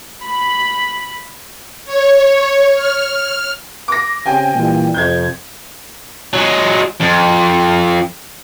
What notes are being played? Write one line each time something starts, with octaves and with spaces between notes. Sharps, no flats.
B5
C#5
F6
D6 A#6
C#3 C4 G4 G5 G#5
A#2 E3 G3
F2 C3 G6 G#6
F#3 G#3
F2